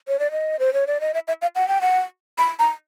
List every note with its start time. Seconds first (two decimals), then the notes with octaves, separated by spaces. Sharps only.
0.08 C#5
0.19 D5
0.31 D#5
0.60 C5
0.73 C#5
0.87 D5
1.01 D#5
1.14 E5
1.28 E5
1.42 F5
1.55 F#5
1.68 G5
1.81 F#5
2.38 B5
2.59 A#5